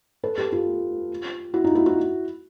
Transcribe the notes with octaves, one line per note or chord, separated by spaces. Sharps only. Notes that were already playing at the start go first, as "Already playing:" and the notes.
A4 B4
G4 A4
F4 G4
E4 F#4
D#4 F4
E4 F#4
E4 F#4